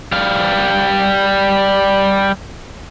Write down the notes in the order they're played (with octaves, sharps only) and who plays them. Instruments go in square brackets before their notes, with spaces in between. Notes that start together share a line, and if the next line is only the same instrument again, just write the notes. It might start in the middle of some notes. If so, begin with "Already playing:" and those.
[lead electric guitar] G3 F5